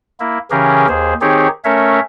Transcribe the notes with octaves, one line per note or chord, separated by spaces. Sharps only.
A#3 E4
C#3 E3 C#4 G4 G#4 A#4
D#2 G#4 C5
D#3 C4 D#4 G4 G#4 C#5
A3 C#4 A#4 C#5 E5